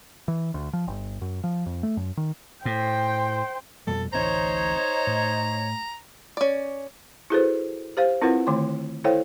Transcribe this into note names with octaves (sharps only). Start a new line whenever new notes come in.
E3
D2
F3
G1
F#2
F3
F2
A3
F#2
D#3
A2 C5 G5
F2 B2 G3 A4
D1 A1 C4 D#4 C5 C#5 A#5
A2
C#4 D5
E4 F#4 G#4 A4 B4 C5
G4 C5 F5
C4 E4 F4 A#4 B4 F#5
D3 D#3 A3 C6
E4 A4 C5 C#5 F5 G5